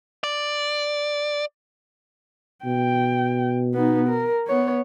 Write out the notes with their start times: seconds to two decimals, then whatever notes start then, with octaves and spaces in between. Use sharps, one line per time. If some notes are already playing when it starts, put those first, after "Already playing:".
0.24 D5
2.65 B2 G5
3.74 B3 D#4
4.09 A#4
4.47 B3 C#5